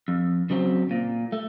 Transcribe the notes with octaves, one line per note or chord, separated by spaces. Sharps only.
F2
C#3 F#3 C4
A#2
A3